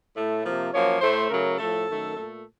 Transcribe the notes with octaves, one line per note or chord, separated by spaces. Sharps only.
A2 A3
C3 F3 A#3
F#2 F3 A#3 C#5
A2 A3 C5
C#3 F#3 A3 A#4
A2 F3 A3 A4
F#2 D#3 A3
A#2 A3